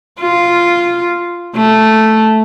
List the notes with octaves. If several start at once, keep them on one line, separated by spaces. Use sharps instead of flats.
F4
A3